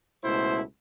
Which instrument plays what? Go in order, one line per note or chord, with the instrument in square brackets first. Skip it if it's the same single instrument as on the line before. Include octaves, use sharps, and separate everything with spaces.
[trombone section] C#2 B2 A3 E4 C5